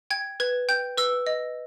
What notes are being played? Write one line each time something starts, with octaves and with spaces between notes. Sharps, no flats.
G5 G#6
B4 G#6
G5 G6
B4 E6
D#5